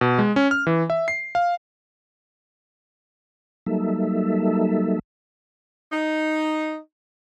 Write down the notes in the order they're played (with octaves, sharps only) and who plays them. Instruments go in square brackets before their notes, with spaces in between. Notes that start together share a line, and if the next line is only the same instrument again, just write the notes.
[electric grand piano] B2
G#3
C#4
F6
E3
E5
C7
F5
[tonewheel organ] F#3 G3 A#3 D#4 A4 E5
[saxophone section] D#4